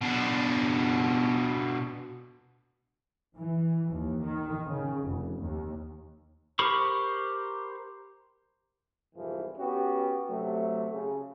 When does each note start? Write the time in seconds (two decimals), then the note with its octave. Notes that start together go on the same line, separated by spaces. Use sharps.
0.02 B2 D4
3.37 E3
3.92 D#2
4.23 D#3
4.66 C#3
5.09 F1
5.42 D#2
6.59 G4 A#4 C5 B5 C#6
9.15 C2 F2 G#2 E3 F3
9.58 B3 C#4 F#4 G4
10.30 C3 F#3 A3
10.92 C#3